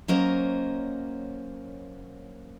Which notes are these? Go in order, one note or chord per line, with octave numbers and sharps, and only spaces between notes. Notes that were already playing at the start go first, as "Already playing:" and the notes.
F#3 A#3 C#4 A#4 C5 D#5